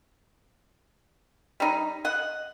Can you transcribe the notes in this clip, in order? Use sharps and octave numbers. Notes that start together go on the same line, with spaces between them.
G3 D#4
D#5 F#5